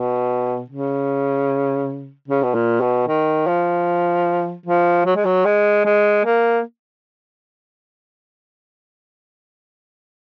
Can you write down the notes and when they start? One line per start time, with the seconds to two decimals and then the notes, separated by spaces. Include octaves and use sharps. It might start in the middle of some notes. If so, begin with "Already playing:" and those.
Already playing: B2
0.70 C#3
2.28 C#3
2.43 B2
2.54 A#2
2.81 B2
3.08 D#3
3.47 F3
4.66 F3
5.06 F#3
5.16 G#3
5.25 F#3
5.46 G#3
5.85 G#3
6.25 A#3